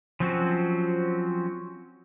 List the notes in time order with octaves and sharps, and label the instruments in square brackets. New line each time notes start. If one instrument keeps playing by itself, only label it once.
[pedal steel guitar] F3 F#3 C4 C#4 F#4